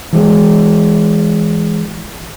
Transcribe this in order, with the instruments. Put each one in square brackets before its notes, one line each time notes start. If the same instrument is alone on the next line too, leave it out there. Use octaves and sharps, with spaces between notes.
[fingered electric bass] E3 G#3